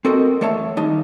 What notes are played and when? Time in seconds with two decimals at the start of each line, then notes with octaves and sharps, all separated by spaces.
0.05 C4 F#4 A4 A#4 D#5
0.41 E2 A3 C#5 E5 A5
0.77 D#2 G3 D#4 A5